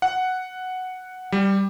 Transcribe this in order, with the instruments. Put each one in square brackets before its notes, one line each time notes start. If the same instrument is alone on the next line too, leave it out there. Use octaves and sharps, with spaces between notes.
[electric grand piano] F#5
G3